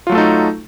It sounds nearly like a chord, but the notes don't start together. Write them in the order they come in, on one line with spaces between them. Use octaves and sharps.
F4 F#3 A3 A4 D#4